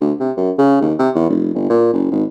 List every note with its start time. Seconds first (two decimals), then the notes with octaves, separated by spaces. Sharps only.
0.01 D2
0.20 C3
0.37 F#2
0.59 C#3
0.81 D#2
0.99 C3
1.15 E2
1.30 F1
1.54 G1
1.70 A#2
1.93 F#1
2.12 G#1